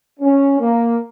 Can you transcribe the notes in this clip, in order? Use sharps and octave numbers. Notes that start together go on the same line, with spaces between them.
C#4
A#3